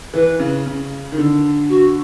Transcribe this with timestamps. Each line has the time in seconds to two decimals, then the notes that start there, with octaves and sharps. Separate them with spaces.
0.13 E3 B4
0.39 C#3
0.66 C#3
1.12 D#3
1.18 D3
1.69 F#4